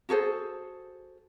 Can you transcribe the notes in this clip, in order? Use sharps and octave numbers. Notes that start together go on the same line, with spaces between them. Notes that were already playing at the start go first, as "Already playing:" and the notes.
F#4 G#4 A4 C5